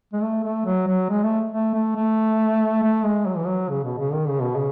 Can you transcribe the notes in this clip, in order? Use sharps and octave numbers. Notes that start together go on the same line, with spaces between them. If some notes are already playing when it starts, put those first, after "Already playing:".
G#3
A3
A3
F#3
F#3
G#3
A3
A3
A3
A3
A3
G#3
F#3
E3
F#3
C#3
B2
C#3
D#3
C#3
B2
C#3